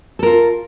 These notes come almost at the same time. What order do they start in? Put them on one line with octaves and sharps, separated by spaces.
A4 A#4 F4